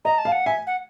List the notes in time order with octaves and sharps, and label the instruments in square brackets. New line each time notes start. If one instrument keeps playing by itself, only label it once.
[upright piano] D#5 [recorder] A#5
[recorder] A5
[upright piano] F5
[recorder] F#5
[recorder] E5 [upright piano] G#5
[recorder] F#5